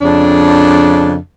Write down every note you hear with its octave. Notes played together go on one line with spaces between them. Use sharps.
F2 C#3 D4